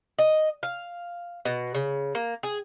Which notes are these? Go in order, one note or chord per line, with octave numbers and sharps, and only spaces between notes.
D#5
F5
B2
C#3
A#3
G#4